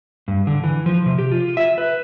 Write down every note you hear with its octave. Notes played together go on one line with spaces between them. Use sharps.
G2
D3
E3
F3
C3
G4
F4
E5
B4